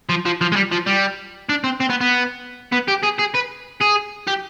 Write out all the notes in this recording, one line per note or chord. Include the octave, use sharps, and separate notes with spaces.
F3
F3
F3
G#3
G3
F3
G3
D4
C4
C4
B3
B3
B3
G4
G#4
G#4
B4
G#4
G4